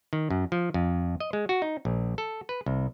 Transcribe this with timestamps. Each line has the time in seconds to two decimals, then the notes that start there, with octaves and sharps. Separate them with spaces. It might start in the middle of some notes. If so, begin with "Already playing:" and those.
0.13 D#3
0.30 F#2
0.52 F3
0.74 F2
1.20 D#5
1.33 G#3
1.49 F#4
1.62 D#4
1.85 A#1
2.18 A4
2.49 B4
2.66 C2